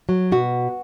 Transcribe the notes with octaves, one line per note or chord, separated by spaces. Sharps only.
F#3
B2 F#4